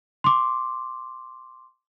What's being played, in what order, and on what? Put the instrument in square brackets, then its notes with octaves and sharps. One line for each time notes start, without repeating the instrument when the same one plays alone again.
[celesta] C6 D6